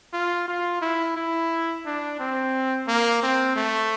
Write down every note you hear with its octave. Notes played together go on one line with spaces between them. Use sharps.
F4
F4
E4
E4
D4
C4
A#3
C4
A3